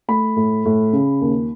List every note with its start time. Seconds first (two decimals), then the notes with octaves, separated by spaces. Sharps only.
0.08 A3 B5
0.36 A2
0.65 A2
0.93 C#3
1.21 D#2